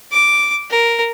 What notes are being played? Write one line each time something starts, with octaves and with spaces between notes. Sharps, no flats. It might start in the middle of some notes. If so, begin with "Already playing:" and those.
D6
A#4